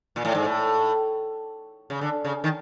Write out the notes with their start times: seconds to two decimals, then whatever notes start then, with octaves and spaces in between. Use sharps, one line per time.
0.16 A#2
0.25 A2
0.35 G#2
0.44 A2
1.90 C#3
2.01 D3
2.25 C#3
2.44 D#3